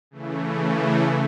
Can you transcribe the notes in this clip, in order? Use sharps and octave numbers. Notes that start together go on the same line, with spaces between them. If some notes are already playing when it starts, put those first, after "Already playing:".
C#3 E3 A3